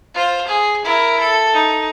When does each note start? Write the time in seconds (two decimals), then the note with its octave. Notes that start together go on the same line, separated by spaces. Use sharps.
0.15 F4 C5
0.47 G#4
0.85 E4 A#4
1.20 A4
1.54 D#4